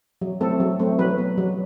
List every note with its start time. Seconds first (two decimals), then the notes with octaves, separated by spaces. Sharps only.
0.21 F#3
0.41 A3 C4 A4
0.60 F#3
0.80 A3 C4
0.99 F#3 B4
1.18 B3
1.38 F#3